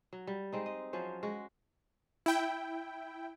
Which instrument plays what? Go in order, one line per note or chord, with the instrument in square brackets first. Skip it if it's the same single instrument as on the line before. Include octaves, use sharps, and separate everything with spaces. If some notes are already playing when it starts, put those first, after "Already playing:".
[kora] F#3
G3
G#3 C4 D#4
D#5
F3 F#3 C#4 C5
G#3 F#4
[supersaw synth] E4 G5